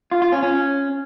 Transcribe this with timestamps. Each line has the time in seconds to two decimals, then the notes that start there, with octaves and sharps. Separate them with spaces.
0.11 F4
0.22 F4
0.32 C#4
0.43 C#4